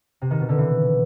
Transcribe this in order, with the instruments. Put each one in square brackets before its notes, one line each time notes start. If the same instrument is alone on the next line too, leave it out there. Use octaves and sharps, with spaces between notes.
[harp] C3
D#3
B2
D3
E3